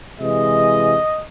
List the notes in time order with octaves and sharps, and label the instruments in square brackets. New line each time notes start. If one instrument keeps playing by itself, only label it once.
[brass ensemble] C3 E3 G#3 D#5